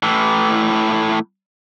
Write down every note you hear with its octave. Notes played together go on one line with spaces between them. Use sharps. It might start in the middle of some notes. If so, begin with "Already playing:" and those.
A2 E3